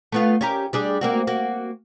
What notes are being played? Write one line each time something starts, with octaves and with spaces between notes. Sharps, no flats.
A3 B3 F4
C#4 G4 A#4
G3 D4 G#4
A#3 C4 F#4
A#3 F#4